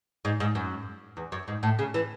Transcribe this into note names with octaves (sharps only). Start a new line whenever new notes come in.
G#2
G#2
F#2
E2
F#2
G#2
A2
C#3
E3